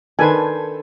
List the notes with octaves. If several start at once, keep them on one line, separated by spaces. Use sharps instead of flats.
D#3 D4 A4 B4 C5 G#5